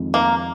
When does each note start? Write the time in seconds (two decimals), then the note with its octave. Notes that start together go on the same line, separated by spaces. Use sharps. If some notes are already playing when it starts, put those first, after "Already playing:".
Already playing: F2 D#3 G#3 C4 D#4
0.14 A#3